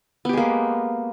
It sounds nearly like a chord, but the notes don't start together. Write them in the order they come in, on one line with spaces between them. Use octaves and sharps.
B3 G4 G#3 A#3